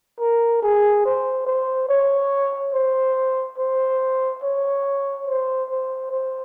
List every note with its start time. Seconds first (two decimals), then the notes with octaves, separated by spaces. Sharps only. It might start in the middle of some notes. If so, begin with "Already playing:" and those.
0.20 A#4
0.63 G#4
1.05 C5
1.47 C5
1.89 C#5
2.74 C5
3.58 C5
4.43 C#5
5.27 C5
5.70 C5
6.12 C5